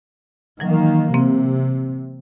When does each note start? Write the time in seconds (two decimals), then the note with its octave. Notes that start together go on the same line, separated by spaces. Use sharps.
0.60 D#3 E3 F#3 A#3
1.14 C3 A#3 C4